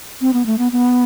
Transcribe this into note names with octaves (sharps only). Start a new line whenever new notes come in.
C4
B3
A3
B3
B3